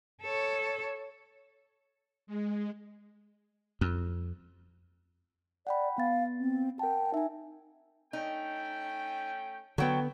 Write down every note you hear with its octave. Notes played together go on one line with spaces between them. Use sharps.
A4 C#5
G#3
F2
D5 F#5 G5 B5
B3 F5 A6
C4
A#4 F#5 G5 A5
D#4 E5 G#5
A3 C#4 D#4 G5
D3 F#3 B3 G5